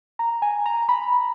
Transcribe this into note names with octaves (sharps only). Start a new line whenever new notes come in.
A#5
G#5
A#5
B5